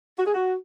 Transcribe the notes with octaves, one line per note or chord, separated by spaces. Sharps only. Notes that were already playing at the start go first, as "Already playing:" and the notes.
F#4
G#4
F#4